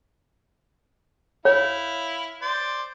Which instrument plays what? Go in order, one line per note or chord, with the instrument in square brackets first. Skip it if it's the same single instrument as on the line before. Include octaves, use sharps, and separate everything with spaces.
[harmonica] E4 F5 [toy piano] C#5
[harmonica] C5 D5